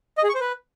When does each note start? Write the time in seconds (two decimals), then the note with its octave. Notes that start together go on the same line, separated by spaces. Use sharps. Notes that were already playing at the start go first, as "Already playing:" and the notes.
0.18 D#5
0.23 G#4
0.29 C#6
0.35 C5
0.40 B4